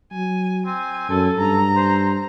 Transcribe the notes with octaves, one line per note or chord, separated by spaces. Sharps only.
F#3 G#5
C4 G#5
F#2 A4
G2 A#5
C5